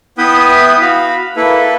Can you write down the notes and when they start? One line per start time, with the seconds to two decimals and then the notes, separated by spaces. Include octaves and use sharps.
0.18 B3 E4 B4 E5 G5 D#6
0.81 F#4 F5 B5
1.36 A#3 E4 A4 B4